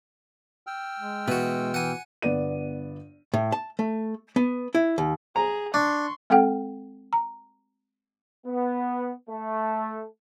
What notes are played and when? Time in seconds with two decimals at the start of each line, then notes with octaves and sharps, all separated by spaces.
0.67 G5 E6 F6
0.99 G#3
1.28 B2 E3 F#4
1.74 E3 F#5 G#5
2.22 G1 B3 D5 D#7
3.34 A2
3.52 A5
3.79 A3
4.36 B3
4.75 E4
4.98 D#2
5.36 G#4 A#5
5.74 D4 C6 C#6
6.30 G#3 C4 A4 F#5 G5
7.13 A#5
8.46 B3
9.28 A3